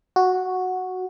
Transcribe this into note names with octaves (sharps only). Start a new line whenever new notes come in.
F#4